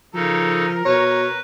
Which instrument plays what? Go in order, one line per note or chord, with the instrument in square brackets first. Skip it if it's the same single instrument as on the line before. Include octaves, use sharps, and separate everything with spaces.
[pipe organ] C#3 D#4 A4 [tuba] F3 [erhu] A#4
[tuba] B2 [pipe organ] B4 [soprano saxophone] C#5